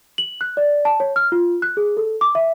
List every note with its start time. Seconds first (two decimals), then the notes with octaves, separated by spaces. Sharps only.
0.18 F#7
0.41 F#6
0.57 D5
0.85 A5
1.00 C#5
1.16 F6
1.32 F4
1.62 F#6
1.77 G#4
1.97 A4
2.21 D6
2.35 E5